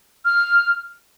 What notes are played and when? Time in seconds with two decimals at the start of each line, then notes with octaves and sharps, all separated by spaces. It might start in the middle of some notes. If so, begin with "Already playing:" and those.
0.25 F6